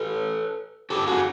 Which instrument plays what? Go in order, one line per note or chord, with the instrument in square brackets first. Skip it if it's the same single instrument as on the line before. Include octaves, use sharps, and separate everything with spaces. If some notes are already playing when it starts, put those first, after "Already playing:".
Already playing: [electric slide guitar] A4 B4
G4 A4
F#4 G#4